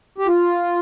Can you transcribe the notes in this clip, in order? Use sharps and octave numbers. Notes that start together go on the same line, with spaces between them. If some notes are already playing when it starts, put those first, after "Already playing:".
G4
F4